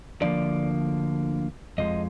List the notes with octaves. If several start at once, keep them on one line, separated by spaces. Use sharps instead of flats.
D2 D3 F3 A#3 D5
F2 F3 G#3 D#5